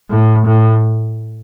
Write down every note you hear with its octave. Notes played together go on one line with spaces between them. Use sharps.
A2
A2